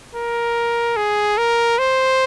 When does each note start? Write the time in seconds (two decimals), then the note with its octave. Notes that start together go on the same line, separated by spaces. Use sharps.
0.14 A#4
0.96 G#4
1.38 A#4
1.79 C5